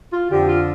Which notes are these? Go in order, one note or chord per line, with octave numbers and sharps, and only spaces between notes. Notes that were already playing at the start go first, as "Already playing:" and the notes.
F4
F2 D3 F3 G4
F4